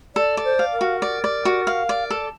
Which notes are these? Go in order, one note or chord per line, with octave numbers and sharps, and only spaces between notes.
A4 D5
D5
C5
F5
A#4
F#4
D5
D5
F#4
F5
D5
A4